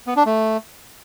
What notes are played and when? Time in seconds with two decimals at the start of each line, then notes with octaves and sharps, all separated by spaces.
0.07 B3
0.16 D4
0.26 A3